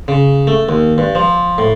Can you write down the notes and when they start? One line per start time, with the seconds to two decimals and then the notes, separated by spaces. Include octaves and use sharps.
0.08 C#3
0.47 A3
0.69 D#2
0.98 G2
1.15 F3
1.58 A2